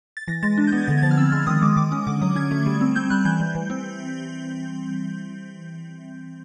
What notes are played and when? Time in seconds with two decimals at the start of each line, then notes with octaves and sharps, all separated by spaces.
0.17 A6
0.28 E3 A#6
0.43 G#3 A6
0.57 D4
0.67 G6
0.72 B3 G#6
0.87 D3 A6
0.97 G#6
1.02 F3 A6
1.11 F6
1.17 C4 E6
1.32 G#3 F6
1.47 D#3 D#6
1.62 G#3 D6
1.77 D#3 D6
1.92 C#4 D#6
2.07 D3 D6
2.21 F#3 D#6
2.36 C#4 G#6
2.51 A3
2.66 G3
2.81 C4
2.96 C4 G6
3.10 G3 F#6
3.25 E3 G6
3.40 G3
3.55 E3
3.70 C4